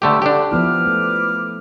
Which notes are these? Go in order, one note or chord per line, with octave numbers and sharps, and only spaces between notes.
G2 D3 A3 G4 E6
D2 D3 D4 G4
F3 B3 E4 B4 D6 F6
A3